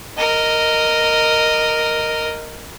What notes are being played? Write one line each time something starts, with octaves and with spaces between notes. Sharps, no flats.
A#4 D#5